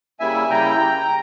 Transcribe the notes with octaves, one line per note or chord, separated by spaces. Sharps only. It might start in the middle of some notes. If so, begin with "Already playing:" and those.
C#3 G3 A#3 E4 E5 G#5
C#3 G3 A#3 E4 G5 A#5